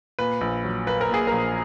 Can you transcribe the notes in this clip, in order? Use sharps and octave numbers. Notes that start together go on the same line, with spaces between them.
A#2 B4
A#1
F#3
A#3 B4
A#4
A#2 G#4
A#1 A#4